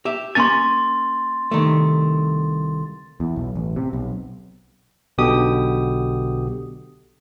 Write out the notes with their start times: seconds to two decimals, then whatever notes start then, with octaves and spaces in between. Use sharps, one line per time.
0.05 G4 E5
0.35 A#3 C#4 G#5 C6 A6
1.51 C2 D#3 A3
3.20 E2
3.36 B1
3.55 A1
3.76 C3
3.93 B1
5.18 B1 B2 D3 G4 D#6